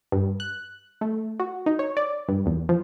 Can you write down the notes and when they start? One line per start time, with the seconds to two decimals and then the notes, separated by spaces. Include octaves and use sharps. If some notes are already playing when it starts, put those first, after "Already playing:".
0.12 G2
0.40 F#6
1.01 A3
1.40 F#4
1.66 D#4
1.79 C#5
1.97 D5
2.28 G2
2.46 E2
2.69 F3